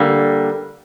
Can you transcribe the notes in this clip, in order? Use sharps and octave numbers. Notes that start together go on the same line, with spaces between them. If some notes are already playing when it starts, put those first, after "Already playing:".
Already playing: D3 G3 A#3